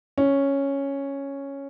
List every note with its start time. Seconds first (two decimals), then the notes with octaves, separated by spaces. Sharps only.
0.18 C#4